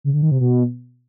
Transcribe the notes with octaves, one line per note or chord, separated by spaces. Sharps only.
C#3
D3
D#3
C3
B2